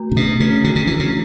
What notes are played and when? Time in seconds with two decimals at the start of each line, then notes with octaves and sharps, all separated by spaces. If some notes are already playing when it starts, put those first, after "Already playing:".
Already playing: A3 F#4
0.12 C#3
0.16 B2 D4
0.40 C#3 A3
0.64 D3 F#4
0.76 C#3
0.87 E3 A3
1.00 C#3